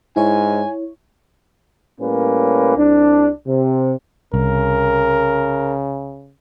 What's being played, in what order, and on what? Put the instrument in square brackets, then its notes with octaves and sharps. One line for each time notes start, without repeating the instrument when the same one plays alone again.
[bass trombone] G#2 [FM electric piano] E4 C#5 [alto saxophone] G#5
[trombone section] A2 G3 A#3 C#4 B4
C2 D4
C3
[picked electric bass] C2 [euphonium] C#3 [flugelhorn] A#4